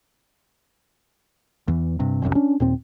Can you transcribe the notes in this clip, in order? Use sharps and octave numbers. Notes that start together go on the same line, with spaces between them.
E2 E3
G2 C3
F1 C2 F#2 C3
C#4 D4
D#2 A#2 C4